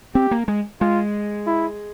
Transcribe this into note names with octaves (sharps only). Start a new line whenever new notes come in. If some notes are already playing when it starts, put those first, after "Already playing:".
C4 G4
A#3
G#3
G#3 F4
E4